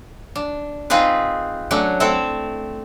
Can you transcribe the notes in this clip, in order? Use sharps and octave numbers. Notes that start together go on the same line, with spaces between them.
D4
C4 D#4 F4 G#4 B4
F#3 A3 C#4 D4
A3 C4 E4 A4